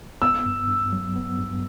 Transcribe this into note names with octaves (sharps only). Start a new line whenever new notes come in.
B3 E6
G2
G2
F#3
B3
G2